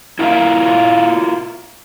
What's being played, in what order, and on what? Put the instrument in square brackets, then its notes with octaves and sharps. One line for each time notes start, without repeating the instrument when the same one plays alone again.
[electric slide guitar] E4 F4 A#4 E5 F5